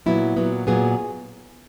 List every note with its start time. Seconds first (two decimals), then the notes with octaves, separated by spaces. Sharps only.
0.06 A#2 F#3 B3 E4
0.36 A#2 F#3 B3
0.67 A#2 F#3 B3 G#4